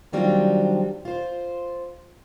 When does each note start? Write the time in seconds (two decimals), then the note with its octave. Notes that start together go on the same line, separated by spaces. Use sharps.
0.13 D#3 F#3 G3 C4 D4 F4
1.05 F4 C5